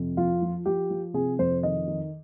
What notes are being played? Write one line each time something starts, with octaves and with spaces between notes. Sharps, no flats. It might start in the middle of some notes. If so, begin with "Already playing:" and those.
Already playing: F2 C3
F3 F4
F3
F3 G4
F3
C3 G#4
F2 C5
D#3 D#5
D#3